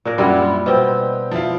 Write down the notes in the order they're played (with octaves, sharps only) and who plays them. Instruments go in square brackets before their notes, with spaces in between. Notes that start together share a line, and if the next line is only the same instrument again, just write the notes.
[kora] A#2 D4 A#4
[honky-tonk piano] F#2 F#5 [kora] G3 D4 E4
[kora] B2 C4 [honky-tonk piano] G4 D#5
[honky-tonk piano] F3 E4 F4